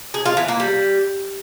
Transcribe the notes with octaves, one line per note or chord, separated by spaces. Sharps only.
G#4
F4
E3
A#3
G3